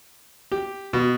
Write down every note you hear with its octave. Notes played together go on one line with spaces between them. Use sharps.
G4
B2